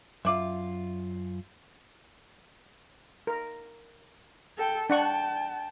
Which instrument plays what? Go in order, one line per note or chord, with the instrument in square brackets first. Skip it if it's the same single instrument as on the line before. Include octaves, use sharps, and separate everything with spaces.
[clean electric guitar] F#2 F4 [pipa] D5 E5
[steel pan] A#4
[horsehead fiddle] A4 G5
[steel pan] D4 F#5 C#6 [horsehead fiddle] G5 A5